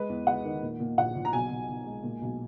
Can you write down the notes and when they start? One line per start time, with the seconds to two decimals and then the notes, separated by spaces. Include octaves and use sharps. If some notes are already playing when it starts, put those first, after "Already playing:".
Already playing: G#3 B4
0.09 E2
0.27 G#3 F#5
0.44 D#3
0.62 A#2
0.80 A#2
0.98 A#1 F#5
1.15 A#1
1.25 A#5
1.33 B1 G#5
1.50 B1
1.68 B1
1.86 G#3
2.03 A#2
2.22 B1